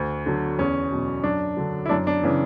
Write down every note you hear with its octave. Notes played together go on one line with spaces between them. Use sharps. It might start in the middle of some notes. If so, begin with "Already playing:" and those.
Already playing: D2
D3 F#3
E2 C#4
B2 F#3
F#2 D4
D3 F#3
E4
F#2 D4
D4
C#3 E3